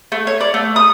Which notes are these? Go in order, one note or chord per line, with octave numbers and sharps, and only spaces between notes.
A3
C#5
D5
A3
D#6